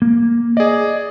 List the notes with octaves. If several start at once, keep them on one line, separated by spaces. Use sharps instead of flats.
A#3
G#4 D5 D#5